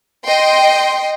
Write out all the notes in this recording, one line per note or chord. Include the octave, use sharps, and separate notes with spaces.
D#5 G5 C6